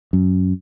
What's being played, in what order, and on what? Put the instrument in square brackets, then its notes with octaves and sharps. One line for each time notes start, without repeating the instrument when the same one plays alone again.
[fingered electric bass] F#2